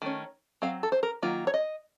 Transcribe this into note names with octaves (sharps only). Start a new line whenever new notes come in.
D#3 A3 C#4
F#3 C4 F5
A4
C5
A#4
D#3 F#3 A#3 F4
C#5
D#5